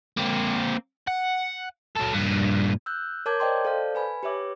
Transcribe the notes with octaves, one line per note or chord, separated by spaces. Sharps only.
A#3 C4
F#5
F#3 A4
G2 A#2
E6 F#6 G6
A#4 C#5 A5 D6 G6 G#6
C5 D5 D#5 G5 A5 C6
A4 C5 D5 F5 A5 G6
B4 G#5 B5
G4 B4 C#5 E5 D6